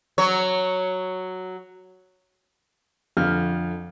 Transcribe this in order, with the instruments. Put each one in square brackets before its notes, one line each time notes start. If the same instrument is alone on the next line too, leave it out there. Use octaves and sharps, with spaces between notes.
[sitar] F#3 C#5
[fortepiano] F2 D3 F6